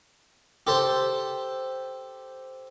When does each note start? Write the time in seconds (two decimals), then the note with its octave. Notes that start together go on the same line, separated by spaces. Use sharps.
0.67 G4 A4 C5 A5